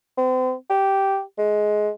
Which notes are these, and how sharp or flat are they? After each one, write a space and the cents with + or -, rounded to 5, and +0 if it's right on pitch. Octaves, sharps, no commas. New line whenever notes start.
C4 -35
G4 -10
G#3 +15